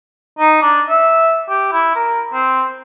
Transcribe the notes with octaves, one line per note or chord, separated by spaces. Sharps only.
D#4
D4
E5
G4
E4
A#4
C4